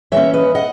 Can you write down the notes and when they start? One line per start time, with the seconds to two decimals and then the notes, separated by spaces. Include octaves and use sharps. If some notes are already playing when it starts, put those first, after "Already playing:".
0.12 E3 A#3 C#4 C#5 E5
0.33 B4 D#5
0.55 D#5 F#5